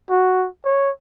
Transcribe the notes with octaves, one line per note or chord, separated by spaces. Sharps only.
F#4
C#5